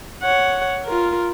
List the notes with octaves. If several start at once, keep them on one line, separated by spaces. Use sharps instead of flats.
C#5 F#5
F4 A#4